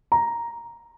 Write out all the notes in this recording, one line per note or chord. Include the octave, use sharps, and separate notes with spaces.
A#5